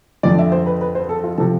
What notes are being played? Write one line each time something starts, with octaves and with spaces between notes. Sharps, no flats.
F2 D3 F3 D5
E5
C5
B4
B4
C5
A4
F4
C3 F3 A4